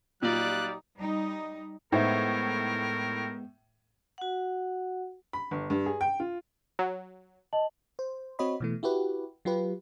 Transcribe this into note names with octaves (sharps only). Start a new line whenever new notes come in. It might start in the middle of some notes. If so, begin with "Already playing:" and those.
A#2 F#3 G3 D#4 F4 G4 D5 F#6
G3 D#4
A2 G#3 B3 D#4 A#4 C5 E5
F#4 F#5
B5
G1
G2
G#4
G5
F4
F#3
D#5 A5 F#7
C5
C4 F#4 C#5 D#5 B5
B2 E3 A3
E4 F#4 G4 B4
F#3 F4 G4 B4